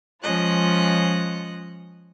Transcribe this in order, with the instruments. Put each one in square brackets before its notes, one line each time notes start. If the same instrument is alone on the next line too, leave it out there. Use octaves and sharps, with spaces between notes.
[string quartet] F3 G#3 C#4 F4 D#5 F#6